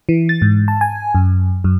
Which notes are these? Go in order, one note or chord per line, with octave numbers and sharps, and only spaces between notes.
E3
A6
G#2
A5
G#5
F#2
F#2